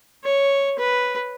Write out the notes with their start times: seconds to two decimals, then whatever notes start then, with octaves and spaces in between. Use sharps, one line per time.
0.24 C#5
0.78 B4